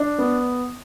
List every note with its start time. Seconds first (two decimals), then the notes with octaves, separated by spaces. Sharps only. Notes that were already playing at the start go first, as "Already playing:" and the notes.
Already playing: D4
0.18 B3